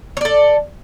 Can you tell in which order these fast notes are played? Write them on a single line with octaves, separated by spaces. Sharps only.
C#5 D5 A4